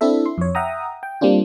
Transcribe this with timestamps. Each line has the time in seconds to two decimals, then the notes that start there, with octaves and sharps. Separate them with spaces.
0.01 C4 D4 E4 A4 E5
0.26 C6
0.38 F2 C#5
0.55 E5 F#5 G5 A#5 D#6
1.03 G5
1.21 G3 A#3 C4 D4 F4